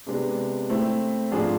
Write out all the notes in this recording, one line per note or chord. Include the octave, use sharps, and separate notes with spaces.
C3 G#3 B3 D4
A3 C4 E4
G#2 F3 A3 D4 G#4